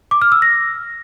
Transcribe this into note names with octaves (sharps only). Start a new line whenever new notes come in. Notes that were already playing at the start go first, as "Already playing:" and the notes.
D6
F6
E6
A#6